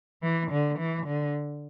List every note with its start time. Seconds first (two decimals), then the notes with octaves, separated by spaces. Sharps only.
0.22 E3
0.51 D3
0.78 E3
1.06 D3